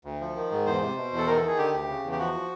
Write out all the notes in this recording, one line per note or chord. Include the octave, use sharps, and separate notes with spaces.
D2
F3
D#3
G#2
E2 C5
C3
B2
E2
A4
D#3 A#4
A4
D#3 G#4
D3 G4
D2
C#3
E2
G4
F3 F#4
F3